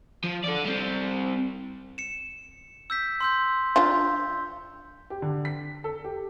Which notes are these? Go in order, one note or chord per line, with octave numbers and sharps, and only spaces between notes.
F3
A4 D5
G3 C4
C#7 E7
E6 G6 B6
C6 E6 G6
F3 D4 F4
G4
D3
B6
A4
G4